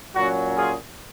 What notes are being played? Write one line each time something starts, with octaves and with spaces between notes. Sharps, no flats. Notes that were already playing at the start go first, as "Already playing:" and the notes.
A#2 F#3 C#4 F#4
F4 G#4